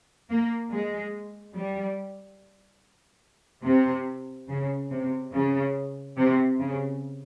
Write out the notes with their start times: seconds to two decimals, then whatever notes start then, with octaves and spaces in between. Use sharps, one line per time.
0.30 A#3
0.72 G#3
1.55 G3
3.65 C3
4.48 C#3
4.90 C3
5.32 C#3
6.17 C3
6.59 C#3